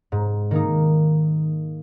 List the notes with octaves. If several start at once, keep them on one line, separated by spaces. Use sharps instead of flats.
G#2
D#3 A#3 D#4